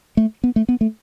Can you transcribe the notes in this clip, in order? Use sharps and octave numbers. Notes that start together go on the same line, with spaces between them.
A3
B3
A3
B3
A3